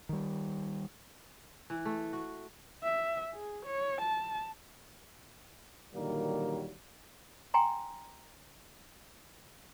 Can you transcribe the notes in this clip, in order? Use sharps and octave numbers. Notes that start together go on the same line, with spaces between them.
D#3 G3
E3
A3
F#4
E5
G#4
C#5
A5
A#2 D3 D#3 F#3 G3 A#3
G5 G#5 A#5 C6